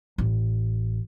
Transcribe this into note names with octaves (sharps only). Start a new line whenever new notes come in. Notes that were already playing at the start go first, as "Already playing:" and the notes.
A1